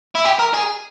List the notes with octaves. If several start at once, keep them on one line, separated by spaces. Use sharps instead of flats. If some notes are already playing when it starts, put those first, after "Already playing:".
E4
G4
A#4
G#4